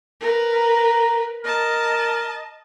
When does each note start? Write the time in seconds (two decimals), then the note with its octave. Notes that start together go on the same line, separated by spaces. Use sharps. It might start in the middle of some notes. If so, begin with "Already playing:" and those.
0.20 A#4 B4
0.53 A#5
1.44 A#4 D#5 A5